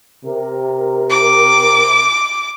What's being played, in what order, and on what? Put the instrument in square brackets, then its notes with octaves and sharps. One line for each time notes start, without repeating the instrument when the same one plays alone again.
[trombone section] C3 A#4
[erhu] D6